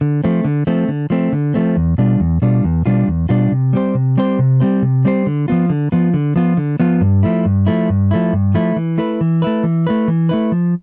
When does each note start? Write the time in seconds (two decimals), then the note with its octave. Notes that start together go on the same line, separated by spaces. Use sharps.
0.01 D3
0.24 F3 A3 C4
0.45 D3
0.67 F3 A3 C4
0.88 D3
1.10 F3 A3 C4
1.32 D3
1.54 F3 A3 C4
1.76 E2
1.98 B2 G3 D4 F4
2.20 E2
2.42 B2 G3 D4 F4
2.64 E2
2.86 B2 G3 D4 F4
3.08 E2
3.29 B2 G3 D4 F4
3.52 C3
3.73 G3 C4 G4 C5
3.95 C3
4.17 G3 C4 G4 C5
4.39 C3
4.60 G3 C4 G4 C5
4.82 C3
5.05 G3 C4 G4 C5
5.26 D3
5.48 F3 B3 F4
5.69 D3
5.92 F3 B3 F4
6.14 D3
6.36 F3 B3 F4
6.57 D3
6.80 F3 B3 F4
7.01 G2
7.23 F3 A3 E4
7.45 G2
7.66 F3 A3 E4
7.90 G2
8.11 F3 A3 E4
8.33 G2
8.54 F3 A3 E4
8.76 E3
8.98 A3 E4 B4
9.21 E3
9.42 A3 E4 B4
9.63 E3
9.87 A3 E4 B4
10.08 E3
10.29 A3 E4 B4
10.52 F3